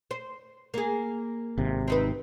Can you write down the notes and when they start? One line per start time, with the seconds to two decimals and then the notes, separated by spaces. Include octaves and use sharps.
0.11 C5
0.74 A#3 G#4
1.58 G#1 C3
1.88 C4 D#4 B4